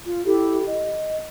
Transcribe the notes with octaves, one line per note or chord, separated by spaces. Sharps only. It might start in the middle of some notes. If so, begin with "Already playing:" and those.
F4
E4 G4 A4
D#5